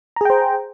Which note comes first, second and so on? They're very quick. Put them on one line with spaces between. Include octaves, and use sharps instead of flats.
A#5 G#4 G5 C5